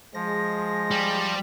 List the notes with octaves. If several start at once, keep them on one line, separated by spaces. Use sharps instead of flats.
F3 G#3 A#6
G3